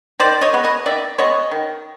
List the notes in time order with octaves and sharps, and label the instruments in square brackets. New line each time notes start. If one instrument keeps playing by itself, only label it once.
[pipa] D#3 C5 D5
C#5 D#5
G#3 B3
C#5 D#5
D#3 D5 E5
G#3 B3 C#5 D#5
D#3